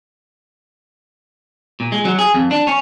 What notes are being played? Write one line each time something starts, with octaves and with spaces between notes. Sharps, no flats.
A#2
G#3
F#3
G#4
F2
D4
C#4